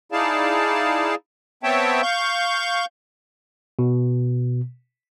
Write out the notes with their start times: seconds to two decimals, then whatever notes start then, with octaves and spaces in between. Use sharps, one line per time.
0.12 D#4 E4 G#4 D5 F5 A5
1.63 B3 C4 C#5 E5 G5 A5
2.02 F5 C#6 G6
3.79 B2